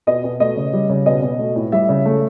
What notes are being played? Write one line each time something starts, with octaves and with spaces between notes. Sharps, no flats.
B2 D#5
B2
A3 D#5
C#3
G3
C#3
B2 D#5
B2
A3
A2
G3 E5
C#3
A3